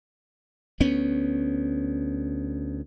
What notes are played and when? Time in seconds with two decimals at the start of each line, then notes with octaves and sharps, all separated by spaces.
0.80 D2 B3 C#4